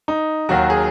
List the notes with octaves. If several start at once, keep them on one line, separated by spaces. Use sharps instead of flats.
D#4
D#2 D#3 F#3 F#4
G#4